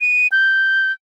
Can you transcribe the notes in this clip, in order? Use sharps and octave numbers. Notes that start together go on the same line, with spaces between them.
D#7
G6